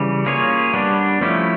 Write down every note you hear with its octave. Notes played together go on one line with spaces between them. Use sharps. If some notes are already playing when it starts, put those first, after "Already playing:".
Already playing: C#3 E3 G3
A#3 C#4 F4 G#4 C#5
G3 B3 D4
F3 A3 C#4 E4